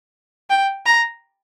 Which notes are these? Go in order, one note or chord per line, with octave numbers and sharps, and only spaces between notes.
G5
A#5